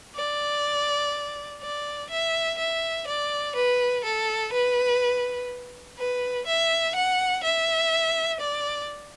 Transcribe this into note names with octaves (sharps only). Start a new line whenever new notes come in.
D5
D5
E5
E5
D5
B4
A4
B4
B4
E5
F#5
E5
D5